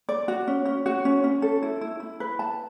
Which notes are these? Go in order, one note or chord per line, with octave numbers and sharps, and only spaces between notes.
D5
F#4
C#4
C#4
F#4
C#4
C#4
A4
E4
E4
E4
B4
A5